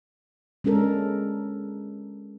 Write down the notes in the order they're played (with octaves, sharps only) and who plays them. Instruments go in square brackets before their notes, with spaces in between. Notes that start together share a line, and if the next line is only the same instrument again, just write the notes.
[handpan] G#3 C#4 D4 A4 A#4